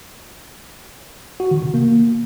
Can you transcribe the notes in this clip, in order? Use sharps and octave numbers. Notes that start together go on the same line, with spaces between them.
F#4
D#3
C3
A#3